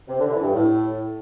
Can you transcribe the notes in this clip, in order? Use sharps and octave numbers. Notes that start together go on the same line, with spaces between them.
C3
D3
E3
G2
A2